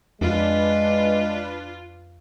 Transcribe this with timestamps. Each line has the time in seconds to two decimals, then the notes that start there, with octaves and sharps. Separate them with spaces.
0.21 F2 G#3 D4 F4 B4